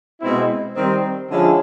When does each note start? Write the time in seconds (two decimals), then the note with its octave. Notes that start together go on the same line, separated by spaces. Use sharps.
0.22 B2 G#3 C4 E4
0.76 D#3 G3 C4
1.30 D3 F3 G#3 C#4 E4